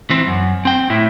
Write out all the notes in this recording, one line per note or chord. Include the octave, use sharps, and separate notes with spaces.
E3 C4
F#2
C4 G5
A2 E4